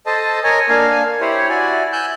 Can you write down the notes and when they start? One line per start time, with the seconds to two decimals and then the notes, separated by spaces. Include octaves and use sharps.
0.06 A4 C5 D#5 A5
0.44 A#4 C#5 D#5 G#5
0.69 A#3 D4 F5 G#5
1.21 E4 G4 C5 C#5
1.49 E4 F#4 D5 G#5
1.92 G#5 E6 F#6 G6